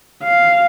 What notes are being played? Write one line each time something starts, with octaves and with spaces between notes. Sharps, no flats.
F5